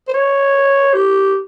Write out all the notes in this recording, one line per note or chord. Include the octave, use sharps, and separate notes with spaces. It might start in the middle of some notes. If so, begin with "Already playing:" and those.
C5
C#5
G4